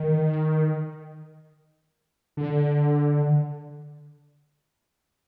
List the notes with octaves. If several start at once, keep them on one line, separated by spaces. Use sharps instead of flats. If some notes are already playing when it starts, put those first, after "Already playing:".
Already playing: D#3
D3